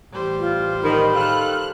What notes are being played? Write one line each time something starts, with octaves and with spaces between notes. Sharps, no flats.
A1 G3 C5
F4
D#3 B5
D#3 F4 A4 F6 F#6